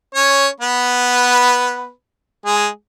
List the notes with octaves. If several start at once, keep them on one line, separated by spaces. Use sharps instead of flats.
C#4 C#5
B3 B4
G#3 G#4